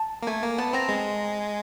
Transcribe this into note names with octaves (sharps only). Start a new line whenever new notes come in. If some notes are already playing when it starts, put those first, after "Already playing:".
Already playing: A5
A#3
A3 G#5
A#3
B3 A5
C4 A#5
G#3